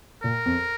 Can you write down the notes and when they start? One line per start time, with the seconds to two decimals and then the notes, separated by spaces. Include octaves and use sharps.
0.23 A#2 A#4
0.46 F2